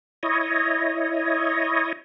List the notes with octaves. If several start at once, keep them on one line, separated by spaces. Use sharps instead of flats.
E4 C#5 D#5